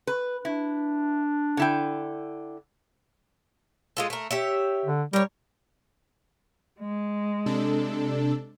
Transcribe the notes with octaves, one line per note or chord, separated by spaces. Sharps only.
B4
D4 E4
D3 E4 G5
G#3 F4 A4
A3 A#4
G4 C#5 E5
D3
G3 A#4 C#5
G#3
C3 D4 A4